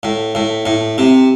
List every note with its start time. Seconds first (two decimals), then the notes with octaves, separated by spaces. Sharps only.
0.03 A2
0.35 A2
0.66 A2
0.98 C3